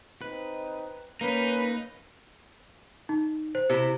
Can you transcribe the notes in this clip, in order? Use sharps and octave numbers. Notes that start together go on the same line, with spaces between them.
C4 D#4 B4
A#3 C#4 D#4 B4
D#4
C5
C3 E4